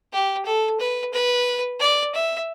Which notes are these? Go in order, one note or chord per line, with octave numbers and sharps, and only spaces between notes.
G4
A4
B4
B4
D5
E5